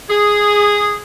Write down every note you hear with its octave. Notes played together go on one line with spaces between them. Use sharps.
G#4